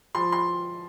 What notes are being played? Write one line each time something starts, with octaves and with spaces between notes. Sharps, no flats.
F3 C6
C6